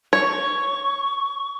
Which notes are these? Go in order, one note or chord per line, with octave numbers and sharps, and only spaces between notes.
C#5 C#6